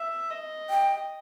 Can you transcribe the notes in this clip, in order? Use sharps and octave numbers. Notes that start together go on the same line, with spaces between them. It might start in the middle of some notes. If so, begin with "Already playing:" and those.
Already playing: E5
D#5
G5